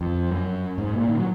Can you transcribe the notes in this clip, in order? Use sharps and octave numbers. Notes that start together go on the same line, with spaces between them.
F2
F#2
G#2
A#2
D#3
F#3